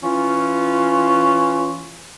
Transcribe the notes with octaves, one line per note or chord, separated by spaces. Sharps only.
E3 C#4 F4